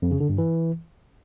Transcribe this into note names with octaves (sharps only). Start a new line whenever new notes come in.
F2
C#3
D3
G2
E3